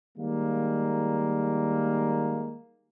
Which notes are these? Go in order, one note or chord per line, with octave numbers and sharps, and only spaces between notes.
D#3 G3 G#3 A#3